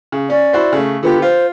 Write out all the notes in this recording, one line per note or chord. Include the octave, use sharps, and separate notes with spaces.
C#3
C#4 D5
E4 F#4 C5
C#3 A3
D3 B3 F4 G4
F4 C5